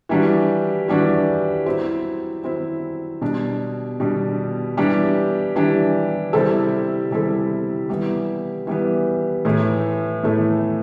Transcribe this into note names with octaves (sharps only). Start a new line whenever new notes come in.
E3 G3 D4 F#4
E3 G3 D4 F#4
F#3 C4 E4
F#3 C4 E4
B2 G3 D4
B2 G3 D4
E3 G3 D4 G4
E3 G3 D4 G4
C3 G3 C4 E4 A4
C3 G3 C4 E4 A4
E3 G3 B3
E3 G3 B3
A2 E3 A3
A2 E3 A3